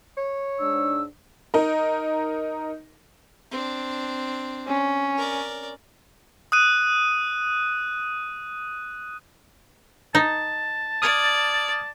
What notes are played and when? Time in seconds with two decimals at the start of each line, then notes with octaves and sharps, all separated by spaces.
0.17 C#5
0.60 G#2 D4 E6
1.54 D#4 A#4
3.52 C4 D4
4.67 C#4
5.18 A#4 D5
6.52 D#6 F#6 D#7
10.15 D#4 A5
11.02 D5 D#6 F6 G#6